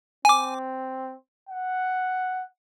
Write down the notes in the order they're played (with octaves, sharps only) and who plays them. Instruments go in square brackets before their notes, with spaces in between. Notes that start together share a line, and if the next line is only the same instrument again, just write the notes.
[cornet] C4 [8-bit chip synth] G#5 D6
[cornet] F#5